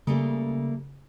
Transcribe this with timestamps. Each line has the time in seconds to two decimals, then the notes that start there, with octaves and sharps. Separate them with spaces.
0.07 C#3 G3 A3 A#3